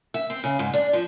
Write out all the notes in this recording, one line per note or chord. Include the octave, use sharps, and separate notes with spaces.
E5
C4
C#3
G#2
D4
F3